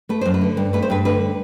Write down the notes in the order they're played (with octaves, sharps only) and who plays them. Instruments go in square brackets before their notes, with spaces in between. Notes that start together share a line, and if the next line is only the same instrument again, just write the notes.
[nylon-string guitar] A3 B4
F#2 C5
B4
D3
G2
A3 B4
C5
G2 B4
D3 B4